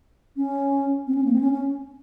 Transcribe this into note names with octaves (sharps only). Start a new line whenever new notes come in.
C#4
C4
C#4
A#3
C4
C#4
C#4